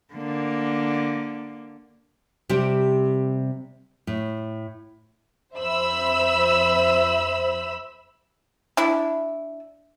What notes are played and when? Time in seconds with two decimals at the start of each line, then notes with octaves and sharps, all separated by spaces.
0.14 D3 A#3
2.49 C3 G3 C4 G4
4.07 A2
5.55 F2 C5 E5 B5 E6
8.77 D4 E4